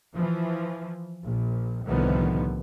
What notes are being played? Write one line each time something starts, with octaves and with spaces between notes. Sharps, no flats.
E3 F3
A#1
C2 A2 D3 D#3 F3 B3